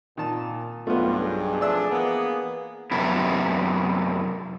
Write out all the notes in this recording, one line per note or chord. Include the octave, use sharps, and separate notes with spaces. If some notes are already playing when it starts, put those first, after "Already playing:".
A#2 D#3 A5
B1 G2 A3 B3 F4
G#4
F3 A3 D4 D5 E5 E6
E3 A#3 B3
F#2 C3 B3 E4